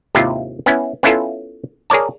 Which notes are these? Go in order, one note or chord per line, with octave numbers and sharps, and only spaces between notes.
G#1 D#2 C3 E4 F4
B3 C#4 E4
B3 C#4 E4 F4 A4
G#4 A#4 C#5 D5 A5